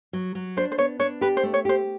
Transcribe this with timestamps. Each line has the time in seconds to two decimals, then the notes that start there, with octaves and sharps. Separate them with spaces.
0.13 F#3
0.35 F#3
0.57 D4 C5
0.72 C5
0.78 B3 C#5
0.99 D4 C#5
1.21 G4 B4
1.37 C5
1.43 A3
1.54 C#5
1.65 G4 C5